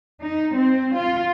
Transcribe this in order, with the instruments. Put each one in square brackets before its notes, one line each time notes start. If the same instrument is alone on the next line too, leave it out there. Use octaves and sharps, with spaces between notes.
[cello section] D#4
C4
F4